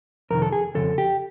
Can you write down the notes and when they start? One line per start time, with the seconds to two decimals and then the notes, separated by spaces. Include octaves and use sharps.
0.30 F2 C3 D#3 A#4
0.42 A4
0.53 G#4
0.75 F2 C#3 A4
0.98 G4